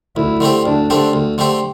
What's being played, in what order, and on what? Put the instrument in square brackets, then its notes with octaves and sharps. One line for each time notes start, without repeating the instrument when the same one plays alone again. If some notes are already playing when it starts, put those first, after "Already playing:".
[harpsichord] D2 [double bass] E4
[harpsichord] D3 A3 C4 G4
[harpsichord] D2 [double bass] D4
[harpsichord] D3 A3 C4 G4
D2
D3 A3 C4 G4